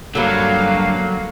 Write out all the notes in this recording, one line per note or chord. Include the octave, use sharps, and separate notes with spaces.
G2 D3 F#3 A#3 F5